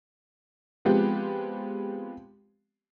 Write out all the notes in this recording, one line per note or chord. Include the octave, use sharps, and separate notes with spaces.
F3 G#3 B3 C4 G4